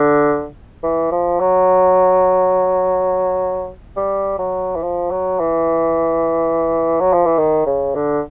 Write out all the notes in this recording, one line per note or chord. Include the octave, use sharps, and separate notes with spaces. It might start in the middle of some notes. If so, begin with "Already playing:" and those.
Already playing: D3
E3
F3
F#3
G3
F#3
E3
F3
F#3
E3
F#3
F3
E3
D#3
C#3
D3